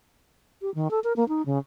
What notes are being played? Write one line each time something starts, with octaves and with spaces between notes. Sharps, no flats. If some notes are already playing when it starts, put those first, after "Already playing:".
G4
D#3
A4
A#4
A#3
D#4
C#3